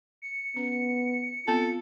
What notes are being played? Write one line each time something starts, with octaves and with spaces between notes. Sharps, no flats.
C#7
B3 C#4
B3 C4 F4 A4 A5